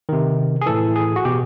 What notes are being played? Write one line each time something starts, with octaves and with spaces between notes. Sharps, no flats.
C3 D#3
G#4
A2 E3 A4
G#4
F#4
B2 G4